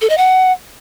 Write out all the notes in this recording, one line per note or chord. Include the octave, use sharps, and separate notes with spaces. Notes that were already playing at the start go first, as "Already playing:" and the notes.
A4
D#5
F#5